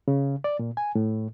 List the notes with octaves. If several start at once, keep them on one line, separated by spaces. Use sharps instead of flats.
C#3
D5
A#2
G#5
A2